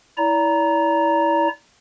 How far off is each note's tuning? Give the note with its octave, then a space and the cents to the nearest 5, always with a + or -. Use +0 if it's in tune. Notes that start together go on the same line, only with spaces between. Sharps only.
E4 -15 D5 -35 A#5 +0